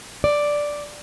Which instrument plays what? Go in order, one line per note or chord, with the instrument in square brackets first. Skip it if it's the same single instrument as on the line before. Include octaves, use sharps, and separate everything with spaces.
[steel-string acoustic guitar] D5